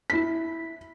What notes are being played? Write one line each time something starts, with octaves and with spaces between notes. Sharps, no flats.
E4 B6